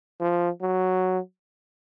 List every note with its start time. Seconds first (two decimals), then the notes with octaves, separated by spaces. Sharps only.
0.21 F3
0.62 F#3